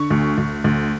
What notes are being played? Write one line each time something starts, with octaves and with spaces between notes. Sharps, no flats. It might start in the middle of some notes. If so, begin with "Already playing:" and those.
Already playing: D3 C#6
D2
D2
D2